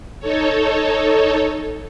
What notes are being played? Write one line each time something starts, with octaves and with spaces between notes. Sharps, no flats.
D#4 A4 C#5